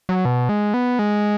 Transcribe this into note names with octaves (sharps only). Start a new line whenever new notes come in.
F#3
B2
G#3
B3
G#3